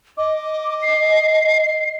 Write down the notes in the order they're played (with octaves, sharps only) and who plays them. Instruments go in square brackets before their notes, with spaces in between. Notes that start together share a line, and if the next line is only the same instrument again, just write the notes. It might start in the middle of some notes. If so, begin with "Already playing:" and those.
[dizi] D#5 [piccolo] D6
[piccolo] C7